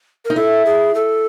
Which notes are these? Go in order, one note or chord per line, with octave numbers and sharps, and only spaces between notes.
A#4
D#4
E4 A4
G#4
A4